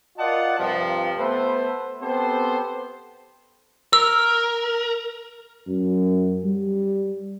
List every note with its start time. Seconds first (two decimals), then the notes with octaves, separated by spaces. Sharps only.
0.18 F4 A#4 D5 D#5 F#5 A5
0.59 G2 C3 F3
1.18 A3 B3 A4 B4 C5
2.01 B3 C4 G4 A4 C5
3.93 A#4 E6 F6
5.67 F#2
6.44 G3